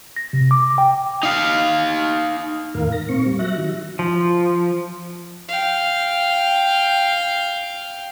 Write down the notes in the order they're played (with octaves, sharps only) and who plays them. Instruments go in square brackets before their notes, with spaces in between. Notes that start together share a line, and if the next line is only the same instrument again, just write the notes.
[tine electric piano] A#6
C3
D6
G5
[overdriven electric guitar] D#4 F5
[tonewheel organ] E2 A2 D#3 A#4 F5
A#6
A#2 C4 C#6
G3
F#3 E5 F#6 A#6
D#3
[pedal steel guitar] F3
[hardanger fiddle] F5 G5